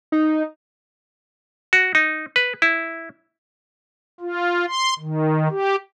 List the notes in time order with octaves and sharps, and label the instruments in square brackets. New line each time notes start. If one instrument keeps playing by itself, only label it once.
[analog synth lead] D#4
[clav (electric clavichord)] F#4
D#4
B4
E4
[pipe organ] F4
C6
D#3
G4